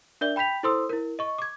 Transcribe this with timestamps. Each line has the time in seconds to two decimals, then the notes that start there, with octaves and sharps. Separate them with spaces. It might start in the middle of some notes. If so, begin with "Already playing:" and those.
0.21 D4 A#4 D5 E5 G6 G7
0.36 G5 B5 G6 B6 F7
0.63 E4 A4 C5 C6 D#6 E6
0.90 E4 A#4
1.19 D#5 C#6
1.38 D6 G#6